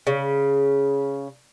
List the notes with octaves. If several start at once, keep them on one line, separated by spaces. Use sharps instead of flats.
C#3